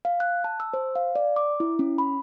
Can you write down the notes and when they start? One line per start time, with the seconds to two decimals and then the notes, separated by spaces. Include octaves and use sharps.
0.05 F5
0.20 F#6
0.44 A5
0.60 E6
0.74 C5
0.95 F5
1.15 D5
1.36 D6
1.60 E4
1.79 C#4
1.98 B5